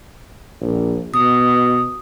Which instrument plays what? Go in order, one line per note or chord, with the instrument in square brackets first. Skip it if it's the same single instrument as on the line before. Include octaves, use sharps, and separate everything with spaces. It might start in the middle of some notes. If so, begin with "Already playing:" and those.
[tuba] A#1
[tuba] B2 [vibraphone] D#6